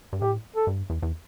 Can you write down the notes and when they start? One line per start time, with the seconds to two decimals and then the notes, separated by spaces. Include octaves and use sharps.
0.13 G2
0.21 A2 G4
0.56 A4
0.67 G2
0.90 E2
1.03 E2